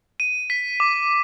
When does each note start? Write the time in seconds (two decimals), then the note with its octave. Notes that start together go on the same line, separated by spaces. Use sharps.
0.20 D#7
0.50 B6
0.80 D6